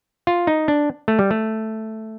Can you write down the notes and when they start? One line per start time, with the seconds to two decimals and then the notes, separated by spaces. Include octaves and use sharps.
0.27 F4
0.47 D#4
0.68 D4
1.08 A3
1.19 G3
1.31 A3